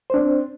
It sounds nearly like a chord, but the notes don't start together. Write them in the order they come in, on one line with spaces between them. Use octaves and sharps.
C5 D4 C4